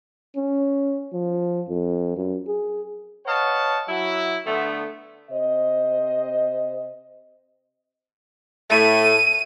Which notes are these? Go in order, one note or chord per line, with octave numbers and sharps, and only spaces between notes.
C#4
F3
F2
F#2
G#4
B4 C#5 D#5 F5 F#5 A5
F#3 E4
D3 A3 B3
C3 C5 D#5
A2 A3 D#7